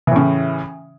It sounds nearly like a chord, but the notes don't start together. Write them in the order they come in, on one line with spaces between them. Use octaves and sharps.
E3 A2 C#3